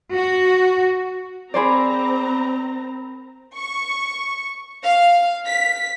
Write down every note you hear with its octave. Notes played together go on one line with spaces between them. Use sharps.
F#4
C4 G#4 A#4 C5 D5 A#5 B5
C#6
F5
B6